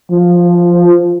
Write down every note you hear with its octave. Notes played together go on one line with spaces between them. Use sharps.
F3